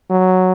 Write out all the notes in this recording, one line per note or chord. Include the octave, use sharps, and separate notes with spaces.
F#3